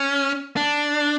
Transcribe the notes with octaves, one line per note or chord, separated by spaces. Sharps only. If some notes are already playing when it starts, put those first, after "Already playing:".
Already playing: C#4
D4